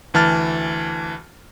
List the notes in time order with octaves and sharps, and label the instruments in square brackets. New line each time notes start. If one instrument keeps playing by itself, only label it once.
[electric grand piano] D2 E3 A5 F6 A6